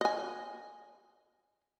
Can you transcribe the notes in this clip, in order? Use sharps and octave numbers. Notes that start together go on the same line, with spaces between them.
D#5 G#5